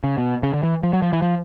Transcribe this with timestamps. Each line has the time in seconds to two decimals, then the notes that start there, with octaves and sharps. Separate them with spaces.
0.04 C#3
0.18 B2
0.43 C#3
0.53 D3
0.63 E3
0.83 F3
0.93 F#3
1.02 F3
1.13 E3
1.22 F3